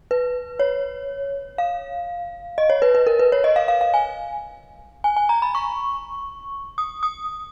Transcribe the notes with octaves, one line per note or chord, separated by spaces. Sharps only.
B4
C#5
F5
D#5
C#5
B4
B4
A#4
B4
C#5
D#5
F5
F5
F5
G#5
G#5
G#5
A#5
B5
C#6
D#6
D#6